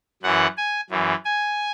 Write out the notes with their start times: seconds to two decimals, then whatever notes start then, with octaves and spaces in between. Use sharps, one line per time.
0.23 F#2 E3 F#5
0.57 G#5
0.90 F#2 E3
1.25 G#5